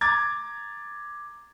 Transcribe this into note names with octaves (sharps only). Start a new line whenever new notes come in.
A#5 D6 G#6 A6